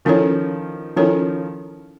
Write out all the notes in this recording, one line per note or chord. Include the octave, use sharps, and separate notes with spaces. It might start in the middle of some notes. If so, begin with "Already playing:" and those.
D#3 F3 C#4 E4 A4 C#5
D#3 F3 C#4 E4 A4 C#5